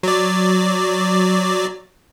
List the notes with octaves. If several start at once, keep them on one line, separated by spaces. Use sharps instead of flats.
F#3 D5